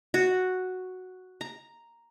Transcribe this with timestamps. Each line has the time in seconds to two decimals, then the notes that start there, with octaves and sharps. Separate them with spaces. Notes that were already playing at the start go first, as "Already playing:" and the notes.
0.14 F#4
1.41 A#5